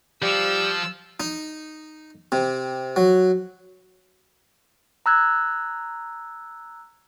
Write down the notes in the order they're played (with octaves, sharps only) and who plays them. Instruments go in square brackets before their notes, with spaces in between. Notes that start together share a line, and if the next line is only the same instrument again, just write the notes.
[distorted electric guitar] F3 [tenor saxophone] G3 [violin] E6
[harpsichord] D#4
C3
F#3
[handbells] A#5 E6 F#6 G#6